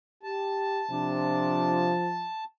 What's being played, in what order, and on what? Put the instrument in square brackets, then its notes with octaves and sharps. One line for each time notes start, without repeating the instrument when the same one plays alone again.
[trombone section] G4 [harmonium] A5
[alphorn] C3 [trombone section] F3 [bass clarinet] D4